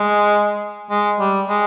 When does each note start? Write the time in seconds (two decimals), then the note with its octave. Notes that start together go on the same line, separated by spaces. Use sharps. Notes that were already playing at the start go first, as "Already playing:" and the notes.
Already playing: G#3
0.90 G#3
1.20 G3
1.48 G#3